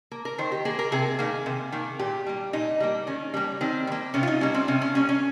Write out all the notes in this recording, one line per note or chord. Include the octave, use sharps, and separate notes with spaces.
A#3 A#4
A#4
D#3 C5
G4
A#3 G#4
A#4
C3 G#4
D#3 A#3
C3
D#3 A#3
A#2 G4
G3 A#3
A#2 D#4
G3 A#3
D#3 C#4
G3 A#3
D#3 C4
G3
A#3
C3 C#4
F4
D#4
G3 A#3 C#4
C4
C3 C#4
C#4
G3 A#3 C#4
C#4